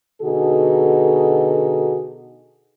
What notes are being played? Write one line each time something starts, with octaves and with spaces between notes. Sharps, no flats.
B2 D3 D#4 F#4 G#4 A4